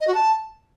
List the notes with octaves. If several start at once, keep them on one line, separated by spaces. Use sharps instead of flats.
D#5
F#4
A5